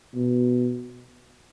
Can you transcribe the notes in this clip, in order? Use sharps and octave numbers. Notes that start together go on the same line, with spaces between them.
B2